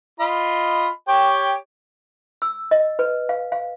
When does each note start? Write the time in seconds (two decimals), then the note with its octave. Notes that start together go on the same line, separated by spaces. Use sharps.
0.20 F4 D#5 B5
1.08 G4 C#5 G5
2.42 E6
2.71 D#5
2.99 B4
3.29 F5
3.52 F5